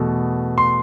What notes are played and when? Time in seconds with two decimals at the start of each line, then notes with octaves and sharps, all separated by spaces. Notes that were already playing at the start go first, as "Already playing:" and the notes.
Already playing: E2 B2 A3
0.58 C6